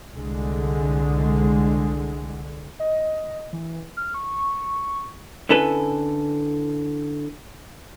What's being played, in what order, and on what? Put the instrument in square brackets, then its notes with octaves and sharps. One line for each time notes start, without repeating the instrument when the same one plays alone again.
[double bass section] C2 D3 G#3
[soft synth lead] D#5
E3
F6
C#6
[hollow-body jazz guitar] D3 C#4 E4 A4 B4 G#5